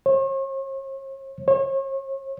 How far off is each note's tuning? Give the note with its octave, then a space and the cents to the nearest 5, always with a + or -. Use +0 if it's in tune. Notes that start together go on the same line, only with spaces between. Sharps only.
C#5 -45
C#5 -40